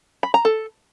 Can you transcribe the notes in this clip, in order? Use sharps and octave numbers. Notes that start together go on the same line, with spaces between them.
B5
A#5
A4